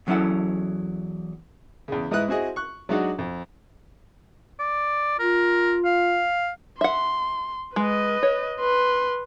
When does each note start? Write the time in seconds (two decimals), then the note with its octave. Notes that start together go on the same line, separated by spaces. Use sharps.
0.07 E2 F#3 C#4 E4 A4 F#5
1.88 E2 C#3
2.11 G#2 D#4 E4 B4 D#6 F#6
2.28 C4 E4 F#4 G#4 D#5
2.56 C#6 F#6
2.89 F#3 G#3 D4 D#4 F#4 F#5
3.19 F2
4.59 D5
5.19 F4 A#4
5.85 F5
6.81 E5 F#5 C6
7.76 G#3 B4 D#5
8.23 C#5
8.60 B4 C6